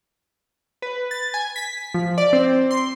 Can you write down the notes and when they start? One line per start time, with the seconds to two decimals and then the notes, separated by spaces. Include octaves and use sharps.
0.82 B4
1.11 A6
1.34 G#5
1.56 B6
1.94 F3
2.18 D5
2.33 C4
2.71 C6